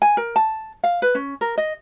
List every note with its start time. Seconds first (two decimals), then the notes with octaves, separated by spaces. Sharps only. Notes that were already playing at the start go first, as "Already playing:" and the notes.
0.02 G#5
0.17 A#4
0.36 A5
0.84 F5
1.02 B4
1.15 C#4
1.41 A#4
1.58 D#5